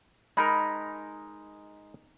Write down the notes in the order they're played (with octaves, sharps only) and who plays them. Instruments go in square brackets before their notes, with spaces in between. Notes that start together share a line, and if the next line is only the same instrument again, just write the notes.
[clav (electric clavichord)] G#3 D#4 A#4 [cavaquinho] B5